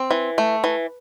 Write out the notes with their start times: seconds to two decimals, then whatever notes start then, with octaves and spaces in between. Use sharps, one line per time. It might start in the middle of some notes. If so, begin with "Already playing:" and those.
Already playing: C4
0.11 E3
0.38 A3
0.64 E3